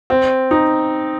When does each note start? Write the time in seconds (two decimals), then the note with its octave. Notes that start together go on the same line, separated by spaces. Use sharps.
0.10 C4
0.51 D#4